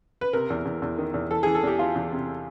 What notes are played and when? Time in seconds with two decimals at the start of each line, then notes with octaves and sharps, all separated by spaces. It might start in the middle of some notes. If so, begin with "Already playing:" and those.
0.21 B4
0.33 C3 A#4
0.50 E2
0.65 E2
0.82 E2
0.98 D#3
1.14 E2
1.31 E3 A4
1.43 E3 G#4
1.55 A4
1.63 E2 G4
1.79 E3 F4
1.96 E2
2.12 C3